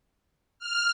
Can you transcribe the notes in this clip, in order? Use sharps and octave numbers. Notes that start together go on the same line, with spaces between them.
F6